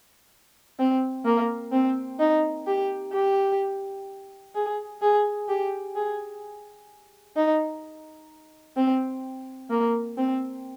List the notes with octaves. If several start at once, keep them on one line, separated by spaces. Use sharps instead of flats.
C4
A#3
C4
D#4
G4
G4
G#4
G#4
G4
G#4
D#4
C4
A#3
C4